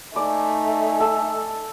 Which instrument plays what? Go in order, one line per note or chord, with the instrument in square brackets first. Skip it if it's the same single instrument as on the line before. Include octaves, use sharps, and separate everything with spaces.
[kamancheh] A3 D#4 [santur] D5 [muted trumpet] G#5
[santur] A4